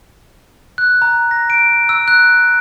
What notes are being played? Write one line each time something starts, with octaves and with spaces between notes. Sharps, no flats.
F#6
A#5
A#6
D7
E6
F#6